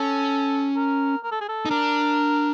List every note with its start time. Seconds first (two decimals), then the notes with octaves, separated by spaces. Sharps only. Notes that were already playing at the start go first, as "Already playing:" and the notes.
Already playing: C#4 A4
0.76 A#4
1.24 A#4
1.32 A4
1.41 G#4
1.49 A4
1.66 D#4
1.71 D4 A#4